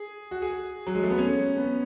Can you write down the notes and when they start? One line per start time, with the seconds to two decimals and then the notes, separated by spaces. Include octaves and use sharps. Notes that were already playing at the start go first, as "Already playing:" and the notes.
Already playing: G#4
0.31 F#4
0.42 G#4
0.87 F#3
0.95 G#3
1.03 A3
1.10 B3
1.18 C#4
1.57 B3